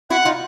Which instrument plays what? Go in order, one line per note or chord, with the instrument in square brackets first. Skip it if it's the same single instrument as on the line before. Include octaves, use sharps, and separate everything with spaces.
[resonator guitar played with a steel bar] E4 F#4 [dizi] F#5
[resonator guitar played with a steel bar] D#4 F4